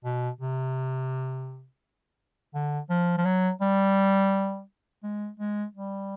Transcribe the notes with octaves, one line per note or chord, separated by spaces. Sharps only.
B2
C3
D3
F3
F3
F#3
G3
G#3
G#3
G3